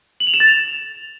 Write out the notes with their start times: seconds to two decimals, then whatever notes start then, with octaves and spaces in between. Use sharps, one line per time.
0.20 F#7
0.27 F7
0.34 E7
0.40 A6
0.47 F7